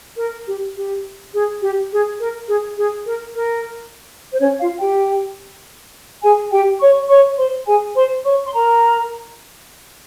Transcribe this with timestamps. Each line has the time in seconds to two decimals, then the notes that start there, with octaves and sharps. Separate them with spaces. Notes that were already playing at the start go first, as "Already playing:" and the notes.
0.18 A#4
0.47 G4
0.76 G4
1.34 G#4
1.62 G4
1.92 G#4
2.20 A#4
2.48 G#4
2.77 G#4
3.06 A#4
3.34 A#4
4.33 C5
4.40 C#4 C#5
4.60 F4 F5
4.79 G4 G5
6.23 G#4 G#5
6.52 G4 G5
6.81 C#5 C#6
7.09 C#5 C#6
7.38 C5 C6
7.66 G#4 G#5
7.95 C5 C6
8.24 C#5 C#6
8.46 C6
8.53 A#4 A#5